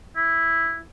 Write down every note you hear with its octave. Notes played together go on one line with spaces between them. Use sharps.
E4